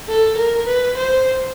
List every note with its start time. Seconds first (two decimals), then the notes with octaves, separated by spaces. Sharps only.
0.09 A4
0.37 A#4
0.67 B4
0.98 C5